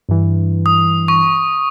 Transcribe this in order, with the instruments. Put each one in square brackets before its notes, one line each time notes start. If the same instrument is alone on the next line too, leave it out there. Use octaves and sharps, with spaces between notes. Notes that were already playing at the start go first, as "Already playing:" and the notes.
[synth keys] G2 E3
[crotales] D#6
C#6